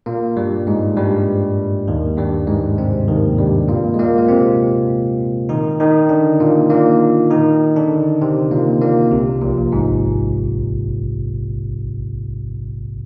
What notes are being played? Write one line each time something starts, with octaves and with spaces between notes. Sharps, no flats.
A#2 A#3
G2 G3
G#2 G#3
G2 G3
D#2 D#3
G2 G3
G#2 G#3
C3 C4
D#2 D#3
G2 G3
A#2 A#3
G#3
A#2 A#3
A#3
C3 C4
D#3 D#4
D#3 D#4
D3 D4
A#2 A#3
A#2 A#3
D#3 D#4
D3 D4
C3 C4
A#2 A#3
A#2 A#3
C2 C3
A#1 A#2
G#1 G#2